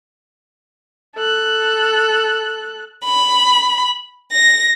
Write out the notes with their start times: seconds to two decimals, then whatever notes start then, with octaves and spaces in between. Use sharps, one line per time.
1.16 A4 F#6
3.04 B5
4.30 A#6